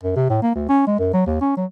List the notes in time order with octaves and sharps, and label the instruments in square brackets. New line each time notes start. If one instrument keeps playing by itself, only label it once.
[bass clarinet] F#2
C3
A2
A#3
D2
C#4
G#3
F#2
F#3
D#2
C#4
F#3